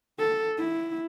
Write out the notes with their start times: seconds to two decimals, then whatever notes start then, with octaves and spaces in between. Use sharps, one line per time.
0.19 A4
0.58 E4